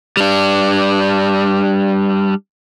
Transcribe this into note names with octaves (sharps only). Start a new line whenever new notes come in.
G3 D4